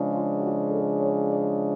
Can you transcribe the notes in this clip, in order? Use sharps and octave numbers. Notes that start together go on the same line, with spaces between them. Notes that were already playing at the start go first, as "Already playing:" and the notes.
Already playing: C#3 F3 G#3 D4
F4
F#4
A4
C#5
D5